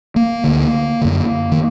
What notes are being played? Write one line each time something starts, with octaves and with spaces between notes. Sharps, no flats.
A#3
D2 D3
F#2 D3
D#3